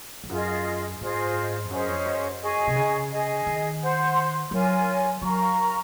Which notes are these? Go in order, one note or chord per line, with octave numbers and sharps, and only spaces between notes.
F2
F#2 F4 G#4 D#5
G#2 F4 G#4 C5 D#5
F2
F#2 C#4 G#4 C5 D#5
F2
F#2
G#4 D#5 G#5 C#6
C3
C#3
G#4 D#5 G#5
D#3
C5 F#5 C6
F#3 F4 A#4 C#5 G#5
F#3 A#4 F5 A#5 C#6